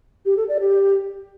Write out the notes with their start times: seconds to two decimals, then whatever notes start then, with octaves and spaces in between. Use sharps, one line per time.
0.25 G4
0.37 A4
0.48 D5
0.60 G4